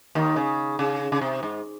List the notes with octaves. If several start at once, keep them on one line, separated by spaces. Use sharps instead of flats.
D#2 D#3
C#3
C#3
C#3
C3
G#2